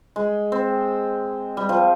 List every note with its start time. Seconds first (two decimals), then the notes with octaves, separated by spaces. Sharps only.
0.16 G#3
0.52 C4
1.57 G3
1.69 F3